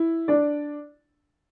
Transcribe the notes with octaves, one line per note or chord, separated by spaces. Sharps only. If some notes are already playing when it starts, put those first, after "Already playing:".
Already playing: E4
D4 D5